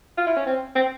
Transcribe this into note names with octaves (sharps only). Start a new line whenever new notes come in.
F4
E4
C#4
C4
C4